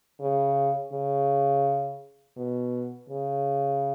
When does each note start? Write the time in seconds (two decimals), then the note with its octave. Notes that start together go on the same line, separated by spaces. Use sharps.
0.21 C#3
0.93 C#3
2.37 B2
3.10 C#3